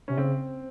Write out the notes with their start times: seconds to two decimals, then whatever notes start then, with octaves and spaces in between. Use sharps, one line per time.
0.08 C3 C#4
0.17 C#3 C4